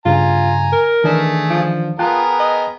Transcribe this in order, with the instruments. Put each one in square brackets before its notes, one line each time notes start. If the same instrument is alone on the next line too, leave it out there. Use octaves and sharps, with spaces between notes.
[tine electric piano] G2 C#3 [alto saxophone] F4 [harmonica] G#5 A#5
[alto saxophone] A#4
[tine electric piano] D#3 E3 D4 [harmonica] A3 G#4
[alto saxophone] F3
[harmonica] B3 G#4 A#4 [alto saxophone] F4 [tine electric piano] G5 A5 F#6
[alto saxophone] D#5